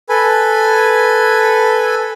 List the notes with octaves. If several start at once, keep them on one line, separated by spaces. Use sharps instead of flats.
A4 B4 G#5 B5